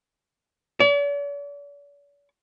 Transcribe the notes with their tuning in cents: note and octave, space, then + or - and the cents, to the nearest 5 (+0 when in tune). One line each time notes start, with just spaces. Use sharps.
D5 -45